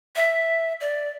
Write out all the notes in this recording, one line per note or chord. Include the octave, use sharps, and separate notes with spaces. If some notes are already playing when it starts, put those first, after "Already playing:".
E5
D5